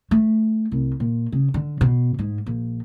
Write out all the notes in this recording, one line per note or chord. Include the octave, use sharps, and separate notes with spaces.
A3
C2
A#2
C#3
D3
B2
G#2
A#1